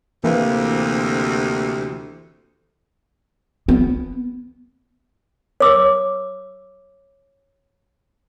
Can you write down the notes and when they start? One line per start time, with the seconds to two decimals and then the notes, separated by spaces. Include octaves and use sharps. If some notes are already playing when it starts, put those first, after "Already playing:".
0.24 D2 C3 E3 A#3
3.68 B3
5.60 C#5 D6 E6